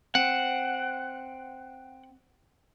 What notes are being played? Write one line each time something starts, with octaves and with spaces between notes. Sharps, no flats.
C4 F#5